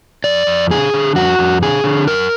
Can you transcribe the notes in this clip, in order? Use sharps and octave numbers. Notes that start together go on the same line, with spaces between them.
F2 D5
F2
D3 G#4
D3
F2 F#4
F2
D3 G#4
D3
F#2 A#4